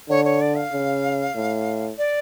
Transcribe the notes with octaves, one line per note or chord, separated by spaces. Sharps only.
D3 C#5
C#5
D5
F5
C#3
A2
D5